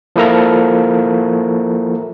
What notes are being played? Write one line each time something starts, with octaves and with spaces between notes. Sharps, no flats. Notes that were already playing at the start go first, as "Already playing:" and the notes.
F3 A#3 E4 A4 A#4 A#5